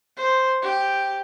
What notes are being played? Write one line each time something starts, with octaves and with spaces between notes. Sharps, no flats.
C5
G4